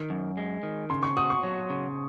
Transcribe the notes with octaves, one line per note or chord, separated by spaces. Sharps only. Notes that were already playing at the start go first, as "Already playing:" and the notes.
Already playing: D#3
F#2
G#3
D#3
C#3 C6
C#6
F#4 D#6
C#6
F#3
C#3